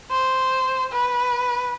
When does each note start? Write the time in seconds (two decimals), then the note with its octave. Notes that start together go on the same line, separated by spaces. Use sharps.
0.11 C5
0.92 B4